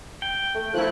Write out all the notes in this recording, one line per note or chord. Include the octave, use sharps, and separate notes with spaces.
G5
A3
F3 A3 E4 F#6